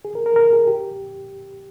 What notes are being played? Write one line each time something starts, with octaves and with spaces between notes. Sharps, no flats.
G#4
A#4
A#4
A#4
G#4
G4